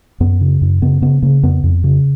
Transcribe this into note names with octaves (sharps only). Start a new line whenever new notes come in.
F#2 B3
C#3
F#2
C#3 B3
C#3 B3
C#3 A#3
F2 B3
F2
C#3